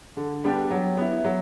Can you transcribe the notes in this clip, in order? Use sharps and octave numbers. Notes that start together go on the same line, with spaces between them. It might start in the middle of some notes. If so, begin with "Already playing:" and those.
D3
G3 B3 D4 G4
F#3
B3 E4
F#3